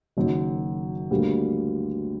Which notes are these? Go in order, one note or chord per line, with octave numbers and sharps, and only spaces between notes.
F#1 F#2 D#3 F#3
D2 D3 G3 A#3